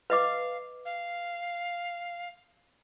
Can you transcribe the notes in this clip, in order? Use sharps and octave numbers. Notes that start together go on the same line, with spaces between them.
B4 D#5 F5 D6
F5